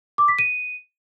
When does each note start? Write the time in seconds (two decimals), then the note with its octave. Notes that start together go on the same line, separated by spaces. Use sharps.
0.18 D6
0.28 B6
0.39 D#7